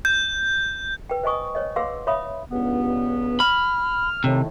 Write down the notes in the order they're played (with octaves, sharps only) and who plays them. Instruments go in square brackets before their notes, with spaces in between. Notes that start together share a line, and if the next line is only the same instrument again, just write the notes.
[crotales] G6
[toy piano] B4 G5
C5 D#5 G#5 C#6 D#6
C5 C#5 D#5
G#4 B4 F5 F#5 C6 E6
C#5 E5 F5 B5 D#6
[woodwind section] C#2 G2 B3
[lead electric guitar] B5 [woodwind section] F6
[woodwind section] A2 D#3 [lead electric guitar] C3